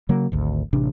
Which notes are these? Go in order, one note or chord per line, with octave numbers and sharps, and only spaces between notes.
C#3 F#3 A#3
G#1 D2
A1 C3 D4